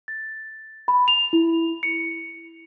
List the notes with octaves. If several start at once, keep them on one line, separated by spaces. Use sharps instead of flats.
A6
B5
F7
E4
C#7